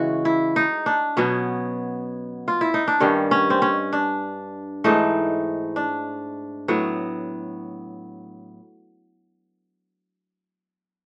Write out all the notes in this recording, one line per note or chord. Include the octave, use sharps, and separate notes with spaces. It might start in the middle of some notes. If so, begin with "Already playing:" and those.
Already playing: C#3 E3 G#3 F#4
E4
D#4
D4
B2 F#3 B3 C#4
F4
E4
D#4
D4
G2 D#3 G3 C#4
C#4
C4
C#4
D4
G#2 E3 A3 D#4
D4
A2 F#3 B3